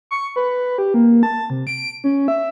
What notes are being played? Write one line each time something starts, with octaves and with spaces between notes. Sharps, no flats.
C#6
B4
G4
A#3
A5
C3
D7
C#4
E5